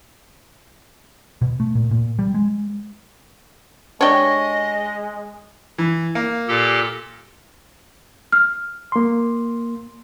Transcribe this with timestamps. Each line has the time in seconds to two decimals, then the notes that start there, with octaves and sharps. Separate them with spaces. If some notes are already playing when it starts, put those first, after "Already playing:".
1.42 B2
1.60 A3
1.75 A#2
1.91 A#2
2.19 G3
2.34 G#3
4.01 G#3 D4 G4 C#5 D#5
5.78 E3
6.15 A#3
6.48 A#2 G4 A4
8.32 F6
8.92 A#3 C6